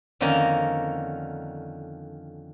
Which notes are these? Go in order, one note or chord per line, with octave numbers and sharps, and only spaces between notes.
F2 D3 D#3 A#3 C#4 A#5